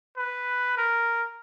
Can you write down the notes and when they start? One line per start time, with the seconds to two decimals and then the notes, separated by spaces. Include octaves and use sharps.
0.17 B4
0.77 A#4